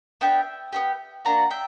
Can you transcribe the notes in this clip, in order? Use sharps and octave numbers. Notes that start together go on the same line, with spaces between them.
B3 D4 G4 E5 G5
B3 D4 G4
A#3 D4 F#4 F#5 A#5
E5 G5